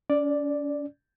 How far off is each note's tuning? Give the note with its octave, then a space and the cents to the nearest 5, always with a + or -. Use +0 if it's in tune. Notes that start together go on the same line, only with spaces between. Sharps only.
C#4 +40 D5 +0